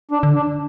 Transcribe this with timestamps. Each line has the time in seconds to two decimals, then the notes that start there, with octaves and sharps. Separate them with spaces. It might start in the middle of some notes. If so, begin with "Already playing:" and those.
0.11 D4
0.23 D3
0.34 D4